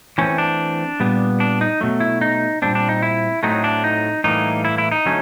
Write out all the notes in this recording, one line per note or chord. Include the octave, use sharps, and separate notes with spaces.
E3 A3 C4 C#4
D4
A#2 G3 B3
D4
D#4
B2 F#3 A3
E4
D#4
A#2 G3 C4 D4
D4
D#4
E4
A2 F#3 A3 C4 D#4
D4
D#4
A2 E3 G3 A#3 D#4
E4
E4
D#4
D3 F#3 A3 C#4